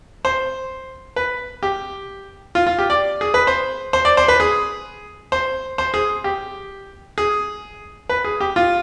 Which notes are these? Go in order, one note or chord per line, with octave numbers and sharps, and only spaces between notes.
C5
B4
G4
F4
F4
G4
D5
G#4
B4
C5
C5
D5
C5
B4
G#4
C5
C5
G#4
G4
G#4
B4
G#4
G4
F4